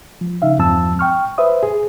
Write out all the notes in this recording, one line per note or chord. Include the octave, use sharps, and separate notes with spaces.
F3
C#3 D#4 E5 F5
E2 G2 F3 C4 A5 E6
G5 C#6 F6
B4 C5 E5 D#6
G#4